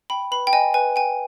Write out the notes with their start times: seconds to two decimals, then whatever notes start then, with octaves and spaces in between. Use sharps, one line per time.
0.10 G5 B5
0.31 B4 B5
0.47 G5
0.53 D#5 G#5
0.74 B4 G#5
0.96 G5 G#5